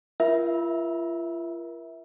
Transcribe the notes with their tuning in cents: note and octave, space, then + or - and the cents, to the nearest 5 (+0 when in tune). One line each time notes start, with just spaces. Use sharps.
F4 -40 A#4 +35 E5 -15